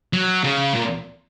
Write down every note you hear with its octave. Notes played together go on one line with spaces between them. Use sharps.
F#3
C#3
A#2